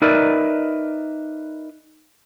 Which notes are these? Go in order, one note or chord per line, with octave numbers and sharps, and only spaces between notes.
D#4 A#4 B4 D5 E5